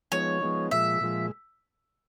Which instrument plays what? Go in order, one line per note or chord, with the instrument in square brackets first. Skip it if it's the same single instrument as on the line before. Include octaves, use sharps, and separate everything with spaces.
[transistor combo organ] F3 G#3 B3 D#4 [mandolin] C#5
[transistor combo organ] F3 G#3 B3 D#4
[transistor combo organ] A#2 F3 G#3 [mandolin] E5
[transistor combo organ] A#2 F3 G#3